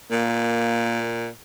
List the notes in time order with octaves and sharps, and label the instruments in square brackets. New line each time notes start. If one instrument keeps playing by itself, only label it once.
[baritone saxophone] A#2 [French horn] A#3